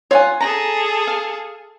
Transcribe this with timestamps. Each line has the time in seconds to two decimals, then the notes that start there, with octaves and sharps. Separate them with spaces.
0.11 F4 C#5 F#5 G#5
0.41 G#4 A4 A#5
1.07 F5